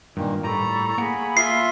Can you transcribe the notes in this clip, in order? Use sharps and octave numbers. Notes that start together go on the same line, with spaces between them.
G2 A#2 D#3
A2 G3 A4 A#5 B5 C#6
A#3 G#4 F#5 B5
F4 E5 C6 C7